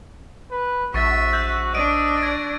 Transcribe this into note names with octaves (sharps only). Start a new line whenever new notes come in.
B4
A#1 F#4 E5 C#6 A6
E6 F#6 G6
D4 D#5 D7 D#7
G#6 A#6 D7